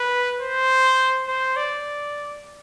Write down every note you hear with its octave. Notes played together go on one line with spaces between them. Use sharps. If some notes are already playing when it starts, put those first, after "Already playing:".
Already playing: B4
C5
C5
D5